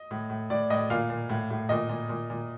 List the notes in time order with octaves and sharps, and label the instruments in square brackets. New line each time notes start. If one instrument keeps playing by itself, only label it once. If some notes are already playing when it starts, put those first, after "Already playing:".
Already playing: [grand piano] D#5
A2
A2
A2 D5
A2 D#5
A#2 F5
A#2
A2
A2
A#2 D#5
A#2
A#2
A#2